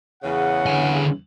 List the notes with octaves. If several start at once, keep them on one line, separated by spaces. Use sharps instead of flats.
E2 C#3 F#5
D3 G#5